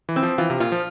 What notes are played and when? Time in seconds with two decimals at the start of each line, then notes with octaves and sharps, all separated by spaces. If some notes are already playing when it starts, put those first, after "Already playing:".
0.09 E3
0.16 C4
0.23 F3
0.38 E3 F4
0.50 C3
0.60 A#2 F4
0.72 F3